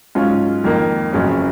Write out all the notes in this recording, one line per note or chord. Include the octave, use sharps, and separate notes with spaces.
G#2 F#3 C#4 F4
F2 D#3 A#3
F#1 F2 C#3 F#3 C#4